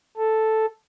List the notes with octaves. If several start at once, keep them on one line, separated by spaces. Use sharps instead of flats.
A4